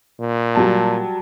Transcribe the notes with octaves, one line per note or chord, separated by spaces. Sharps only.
A#2
F#3 G3 A5